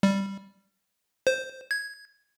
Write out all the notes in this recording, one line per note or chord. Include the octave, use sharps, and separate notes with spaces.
G3
C5
G#6